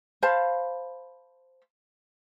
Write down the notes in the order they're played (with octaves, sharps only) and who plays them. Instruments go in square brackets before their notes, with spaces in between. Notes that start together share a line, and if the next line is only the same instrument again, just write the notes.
[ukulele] C5 F5 A5 B5